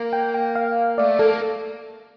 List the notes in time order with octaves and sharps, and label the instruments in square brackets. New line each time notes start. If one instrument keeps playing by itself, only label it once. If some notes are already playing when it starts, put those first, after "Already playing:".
Already playing: [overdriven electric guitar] A#3
[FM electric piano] G5
G5
F5
[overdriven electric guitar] A3 [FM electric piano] D5
[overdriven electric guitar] A#3 [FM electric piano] A4